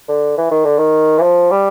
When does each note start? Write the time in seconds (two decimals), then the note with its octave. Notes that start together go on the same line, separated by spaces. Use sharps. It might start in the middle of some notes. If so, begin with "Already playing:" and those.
0.08 D3
0.38 E3
0.51 D#3
0.64 D3
0.78 D#3
1.18 E3
1.22 F3
1.51 G3